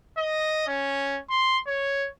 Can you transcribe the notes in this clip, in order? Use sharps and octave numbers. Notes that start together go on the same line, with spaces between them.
D#5
C#4
C6
C#5